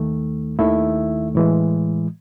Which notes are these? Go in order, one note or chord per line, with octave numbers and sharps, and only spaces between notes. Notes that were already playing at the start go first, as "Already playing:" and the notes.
Already playing: D#2 D#3 A3
D#2 D#3 A3 E4 E5
A2 E3 G#3